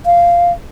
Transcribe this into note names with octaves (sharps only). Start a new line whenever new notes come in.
F5